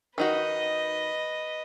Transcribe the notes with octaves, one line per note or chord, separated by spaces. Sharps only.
D#3 D#4 F#4 B4 D#5